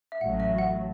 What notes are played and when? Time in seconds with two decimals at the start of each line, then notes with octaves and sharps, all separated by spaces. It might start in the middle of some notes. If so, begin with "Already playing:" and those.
0.12 E5
0.21 A1 A2 F#3 F#5
0.40 E5
0.58 F#5